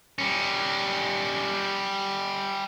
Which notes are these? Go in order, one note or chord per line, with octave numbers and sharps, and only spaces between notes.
G3 C#4